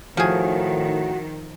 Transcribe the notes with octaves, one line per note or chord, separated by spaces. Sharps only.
A2 D#3 F3 F#4 G#4